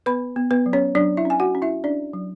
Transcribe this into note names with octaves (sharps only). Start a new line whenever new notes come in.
B3 B4 B5
B3
B3 B4
F#3
C#4 C#5
F#3 D4 D5
E4 E5
C#4
G#5
F#4 F#5
C#4
E4 E5
C#4 D4 D5
F#3